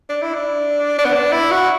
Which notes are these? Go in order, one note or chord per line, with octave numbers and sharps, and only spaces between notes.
D4
E4
D4
D4
B3
D4
E4
F#4